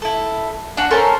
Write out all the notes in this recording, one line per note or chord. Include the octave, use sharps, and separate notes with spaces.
E4 A4
D4 F#4
C#4 A4 A#4 C5